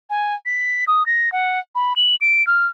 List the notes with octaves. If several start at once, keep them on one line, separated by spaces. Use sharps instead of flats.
G#5
B6
D#6
A#6
F#5
B5
F#7
D7
F6